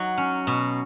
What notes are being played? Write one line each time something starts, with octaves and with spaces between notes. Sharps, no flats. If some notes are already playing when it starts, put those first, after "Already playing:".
Already playing: F#3 D#4 F#4
C#4
B2